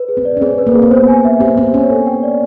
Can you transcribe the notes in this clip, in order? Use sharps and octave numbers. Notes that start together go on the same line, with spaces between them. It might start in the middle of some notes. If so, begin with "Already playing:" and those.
Already playing: B4
G#4
C4
D5
C#4
C4 G#4
B4
A#3
G#4
C4
B3 C5
G#5
E5
C4 G4
C4 C5
C#4 G#5
A4
G5
D5